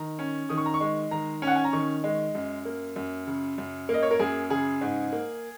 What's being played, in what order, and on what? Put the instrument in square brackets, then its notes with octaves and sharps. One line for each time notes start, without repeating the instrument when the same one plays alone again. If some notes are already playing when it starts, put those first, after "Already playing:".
Already playing: [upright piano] D#3 A#5
C#4
D#3 D#6
C#6
A#5
C#6
G#3
D#3 A#5
C#4
F#5
G#5
A#5
D#3 C#6
G#3
F#2
A#3
F#2
C#3
F#2
A#3
D#5
C#5
A#4
F#2 G#4
C#3 G#4
G#2
A#3